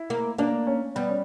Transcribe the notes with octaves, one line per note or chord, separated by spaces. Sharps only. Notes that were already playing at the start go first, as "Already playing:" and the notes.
Already playing: E4
A#3
A#3 D4
C#4
G3 B3
C#4